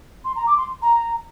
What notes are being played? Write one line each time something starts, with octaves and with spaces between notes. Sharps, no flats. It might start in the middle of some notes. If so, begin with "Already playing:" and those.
C6
A#5
D6
C6
A#5